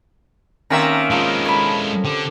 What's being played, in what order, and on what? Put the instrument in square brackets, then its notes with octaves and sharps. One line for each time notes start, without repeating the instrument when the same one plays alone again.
[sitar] D#3 E5 [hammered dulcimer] A#3 C4 C#4 [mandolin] F#4 G#4 A#5
[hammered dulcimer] F3 A#5 [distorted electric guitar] G#3 E4 [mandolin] D#4 F5
[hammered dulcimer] A4 [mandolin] C#5 G#5 B5
[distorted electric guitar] D3 [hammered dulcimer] G4